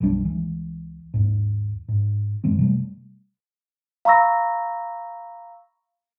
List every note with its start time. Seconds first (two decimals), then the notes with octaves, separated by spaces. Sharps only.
0.01 F#1 B1 G3 D4
0.25 C#2 E3
1.14 D#2 G#2
1.88 G#2
2.44 F#2 E3 G#3 C4
2.59 C3 G3 A3
4.05 F5 A#5 B5 C#6 E6 A#6